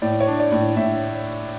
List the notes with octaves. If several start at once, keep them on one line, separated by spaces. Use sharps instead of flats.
A2 D5
C#5
D4
D5
A2
A2 E5